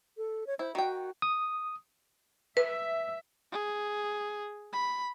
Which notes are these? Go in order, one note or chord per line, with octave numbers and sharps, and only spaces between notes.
A4
C#5
E4 C5
D#3 F#4 G5
D#6
B4 E5
G#4
B5